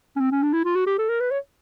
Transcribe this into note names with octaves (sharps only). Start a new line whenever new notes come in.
C#4
C4
C#4
D4
E4
F4
F#4
G4
A4
A#4
B4
C#5